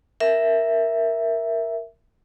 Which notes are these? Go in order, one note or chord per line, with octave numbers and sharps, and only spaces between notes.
A#4 E5